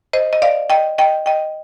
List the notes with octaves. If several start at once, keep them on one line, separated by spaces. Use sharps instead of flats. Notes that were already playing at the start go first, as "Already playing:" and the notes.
C5 D#5
D#5
D5 F5
D#5 G5
D#5 G5
D#5 G5